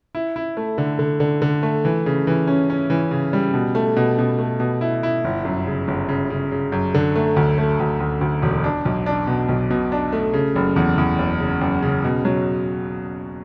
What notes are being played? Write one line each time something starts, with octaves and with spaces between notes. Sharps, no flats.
E4
E4
A3
D3
D3
D3
D3
A3
E3
C#3
E3
C#4
C#4
E3
C#3
G3
B2
A3
B2
B2
A3
B2
E4
E4
G1
F#2
C#3
G1
C#3
C#3
C#3
F#2
D3
A3
D2
A3
D2
D2
D2
E1
D4
B1
D4
B2
B1
B2
D4
A3
C#3
F#1
E2
E2
F#1
C#3
F#1
C#3
B2
F#3